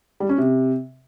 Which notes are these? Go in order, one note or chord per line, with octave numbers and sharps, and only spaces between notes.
G3
C#4
C3